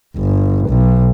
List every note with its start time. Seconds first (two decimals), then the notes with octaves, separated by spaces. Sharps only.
0.17 G1
0.69 B1